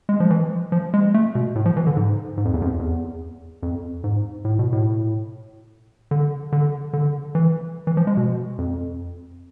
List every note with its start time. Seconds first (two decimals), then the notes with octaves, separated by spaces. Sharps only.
0.09 G#3
0.20 F3
0.31 E3
0.72 F3
0.94 G#3
1.14 A3
1.35 B2
1.55 A2
1.66 F3
1.77 E3
1.87 D3
1.97 G#2
2.37 G#2
2.45 F2
2.54 E2
2.62 F2
2.79 E2
3.63 F2
4.04 G#2
4.45 A2
4.59 B2
4.73 A2
6.11 D3
6.52 D3
6.93 D3
7.35 E3
7.87 E3
7.97 F3
8.07 G#3
8.17 B2
8.58 F2